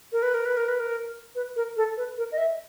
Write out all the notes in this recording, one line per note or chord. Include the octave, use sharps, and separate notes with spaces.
A#4
B4
A#4
B4
A#4
B4
A#4
B4
A#4
A4
B4
A#4
D#5
E5